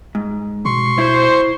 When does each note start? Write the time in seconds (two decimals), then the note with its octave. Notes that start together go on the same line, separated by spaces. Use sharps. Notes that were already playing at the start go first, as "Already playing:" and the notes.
0.15 G#2
0.65 B2 C6 C#6
0.98 E4 C5